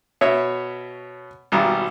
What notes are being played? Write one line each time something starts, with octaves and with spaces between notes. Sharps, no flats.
B2 C#5 E5
G#1 B2 G3 A#5